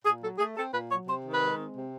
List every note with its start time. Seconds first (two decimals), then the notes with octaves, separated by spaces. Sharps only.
0.04 A#2 G#4
0.21 F#3 A4
0.38 A3 G#4
0.56 C4 A4
0.73 A#2 B4
0.89 F#3 C#5
1.06 C3 C5
1.24 D#3
1.32 B4
1.41 G#3
1.58 C4
1.75 C3